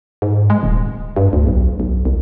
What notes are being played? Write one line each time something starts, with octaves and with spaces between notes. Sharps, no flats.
G#2
G#3
D#1
G2
D2
B1
B1
C2